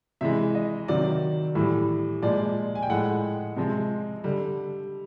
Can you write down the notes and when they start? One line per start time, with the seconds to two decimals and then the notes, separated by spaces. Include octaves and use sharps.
0.21 C3 E3 G#3 E5
0.55 D#5
0.88 C3 D#3 F#3 D5
1.55 A2 E3 G3
2.22 A#2 F3 G#3 D5
2.75 G#5
2.83 G5
2.90 A2 F3 G#3 F#5
3.57 C3 F3 G#3
4.24 D3 G3